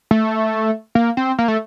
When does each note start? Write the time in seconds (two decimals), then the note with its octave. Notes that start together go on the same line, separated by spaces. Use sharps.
0.11 A3
0.95 A#3
1.17 C4
1.38 A#3
1.48 A3